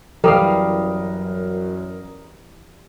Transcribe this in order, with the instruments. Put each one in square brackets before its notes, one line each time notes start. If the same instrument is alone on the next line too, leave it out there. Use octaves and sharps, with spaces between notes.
[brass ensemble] F#2 [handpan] E3 [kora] G3 F5 [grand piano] A#4 D#6